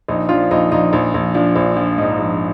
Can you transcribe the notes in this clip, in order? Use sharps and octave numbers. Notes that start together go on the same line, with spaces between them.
A#1 D#4
F3 D4 F4
A#1 D#4
A#1 D#4
A#1
A#1
F3 D4
A#1
F3
G#2 D#4
F3